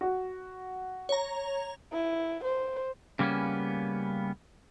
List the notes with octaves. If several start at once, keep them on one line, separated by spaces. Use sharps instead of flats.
F#4
C#5 A#5
E4
C5
C#3 G3 A#3 B3 C#4